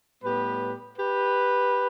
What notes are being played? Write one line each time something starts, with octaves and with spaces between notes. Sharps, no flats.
A2 G3 B3 G4 B4
G4 B4